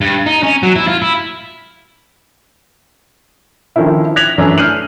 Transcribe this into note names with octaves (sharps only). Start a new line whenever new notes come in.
G2
D#4
C#4
F#3
E4
F4
E4
D3 D#3 F3 C#4 E4
F#6 G#6 A#6 B6 F7 F#7
F#2 D3 E3 A3 C#4 D4
F6 G6 C7 D#7 F#7